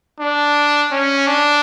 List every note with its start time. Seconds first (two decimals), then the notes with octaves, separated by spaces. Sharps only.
0.19 D4
0.92 C#4
1.27 D4